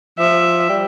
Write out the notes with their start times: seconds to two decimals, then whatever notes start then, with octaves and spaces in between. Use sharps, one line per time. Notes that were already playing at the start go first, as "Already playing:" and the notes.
0.19 F3 E5
0.69 G3